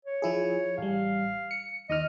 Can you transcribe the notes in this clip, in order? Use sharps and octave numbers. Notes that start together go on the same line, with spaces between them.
C#5
F3 E4 G#4
A1 G3 F5
C#7
D#2 D#4 D#5 F6